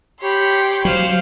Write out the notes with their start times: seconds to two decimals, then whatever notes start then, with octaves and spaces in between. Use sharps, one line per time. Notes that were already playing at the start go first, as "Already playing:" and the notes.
0.22 G4 C#5 B5 C6
0.85 F#3 C5 F5